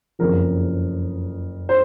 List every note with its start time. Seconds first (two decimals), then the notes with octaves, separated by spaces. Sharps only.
0.19 F#1 F2 C#3 F3 A#4
1.69 C5